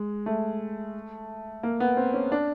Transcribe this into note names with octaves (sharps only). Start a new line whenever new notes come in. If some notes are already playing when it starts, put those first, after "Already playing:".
Already playing: G#3
A3
A#3
B3
C4
C#4
D4